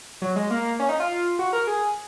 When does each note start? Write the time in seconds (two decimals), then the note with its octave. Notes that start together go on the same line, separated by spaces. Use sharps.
0.22 F#3
0.36 G#3
0.51 A#3
0.79 C#4
0.89 D#4
1.00 F4
1.39 F#4
1.53 A#4
1.67 G#4